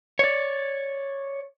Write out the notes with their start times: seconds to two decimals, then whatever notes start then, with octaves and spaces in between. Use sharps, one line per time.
0.19 C#5 D5